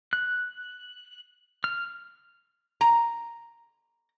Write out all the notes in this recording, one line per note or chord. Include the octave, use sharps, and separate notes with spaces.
F#6
F6
A#5